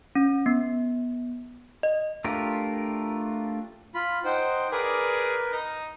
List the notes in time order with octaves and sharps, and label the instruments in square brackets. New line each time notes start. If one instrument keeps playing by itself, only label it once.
[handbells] C#4
B3
D#5
[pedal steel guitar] A3 D4 F4 G4 A#4
[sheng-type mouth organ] F4 B5
[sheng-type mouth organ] D#4 C5 [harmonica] F#5 G5
[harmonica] G#4 D5 [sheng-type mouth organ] A#4 B4
[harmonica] D#4